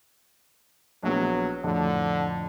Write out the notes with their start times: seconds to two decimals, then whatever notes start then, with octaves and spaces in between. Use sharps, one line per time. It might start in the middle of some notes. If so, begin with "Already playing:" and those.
1.03 A#1 F#3 B3
1.64 F2 A2 D3 F3